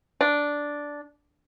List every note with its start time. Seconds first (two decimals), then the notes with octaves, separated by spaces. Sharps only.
0.21 D4